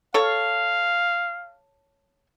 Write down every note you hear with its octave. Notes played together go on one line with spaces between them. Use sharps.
A4 C#5 F5